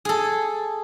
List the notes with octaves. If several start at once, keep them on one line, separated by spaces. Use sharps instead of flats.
G#4 A4